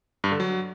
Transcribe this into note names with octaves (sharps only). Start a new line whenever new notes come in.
G2
D3
F#3